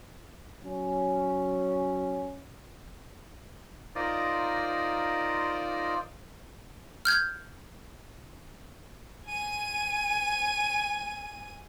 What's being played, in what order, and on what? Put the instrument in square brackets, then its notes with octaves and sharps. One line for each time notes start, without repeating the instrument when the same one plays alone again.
[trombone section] F#3 C#4
[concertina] D#4 F4 A#4 C5 D5 D#5
[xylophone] F6 G6 G#6
[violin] G#5 D#7